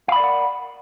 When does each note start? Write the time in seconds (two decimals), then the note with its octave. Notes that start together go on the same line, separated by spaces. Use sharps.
0.08 F5
0.12 B5
0.16 D5
0.20 A#4
0.24 F#5